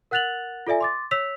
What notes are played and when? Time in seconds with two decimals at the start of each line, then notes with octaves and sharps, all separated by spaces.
0.11 A#4 F#5 F#6 A6 F7 F#7
0.67 F4 A4 D5 E5 G#5
0.81 C6 D6 A6
1.11 C#5 E6 B6 F7